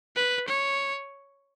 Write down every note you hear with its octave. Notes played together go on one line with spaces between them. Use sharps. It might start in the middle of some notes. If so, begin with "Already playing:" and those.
B4
C#5